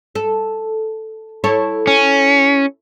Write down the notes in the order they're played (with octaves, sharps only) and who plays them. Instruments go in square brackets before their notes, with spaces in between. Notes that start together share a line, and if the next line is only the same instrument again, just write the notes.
[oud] A4
E4 A4 C#5
[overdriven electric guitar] C#4